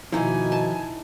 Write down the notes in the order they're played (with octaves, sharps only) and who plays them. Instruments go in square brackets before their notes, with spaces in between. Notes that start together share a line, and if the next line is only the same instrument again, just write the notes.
[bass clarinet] B2 [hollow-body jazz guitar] D#3 F3 [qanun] A#3 D#4 E4 [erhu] G#5
[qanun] A5